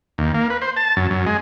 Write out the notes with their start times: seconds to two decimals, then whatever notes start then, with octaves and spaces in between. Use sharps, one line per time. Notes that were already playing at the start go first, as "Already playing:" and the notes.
0.18 D#2
0.35 A#3
0.50 B4
0.62 C5
0.77 A5
0.97 F#2
1.11 F#2
1.27 G#3